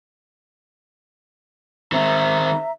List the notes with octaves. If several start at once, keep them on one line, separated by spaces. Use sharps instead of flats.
D#3 C4 E5 A#5